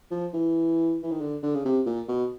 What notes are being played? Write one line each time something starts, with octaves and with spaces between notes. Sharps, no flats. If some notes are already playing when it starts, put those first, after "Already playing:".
F3
E3
E3
D#3
D3
D3
C#3
C3
A#2
B2